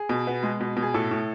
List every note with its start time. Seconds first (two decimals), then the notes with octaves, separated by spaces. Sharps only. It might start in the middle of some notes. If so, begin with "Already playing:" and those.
Already playing: G#4
0.09 B2
0.27 B3
0.43 G#3
0.61 B2
0.77 B2
0.82 G#4
0.94 A2 A4
1.11 A2